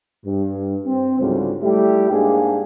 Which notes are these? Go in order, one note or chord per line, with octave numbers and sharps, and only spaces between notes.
G2
C4
C#2 G#2 D3 F#3 G3
G3 A3 E4 G4
G#2 G#3 A#3 D4 G#4